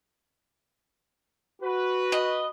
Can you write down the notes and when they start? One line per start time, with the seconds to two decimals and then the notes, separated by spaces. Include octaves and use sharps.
1.62 F#4 B4
2.12 D#5